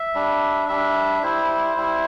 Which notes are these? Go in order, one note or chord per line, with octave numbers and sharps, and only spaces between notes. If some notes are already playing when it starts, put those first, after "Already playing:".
Already playing: E5
G3 D4
G3 D4 E5
G3 E4 C5
G3 E4